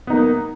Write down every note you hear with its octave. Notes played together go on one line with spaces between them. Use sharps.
A#3 B3 D#4